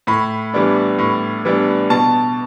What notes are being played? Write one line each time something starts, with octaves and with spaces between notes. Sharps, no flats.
A2 B5
E3 G3 B3 D4
A2
E3 G3 B3 D4
B2 A5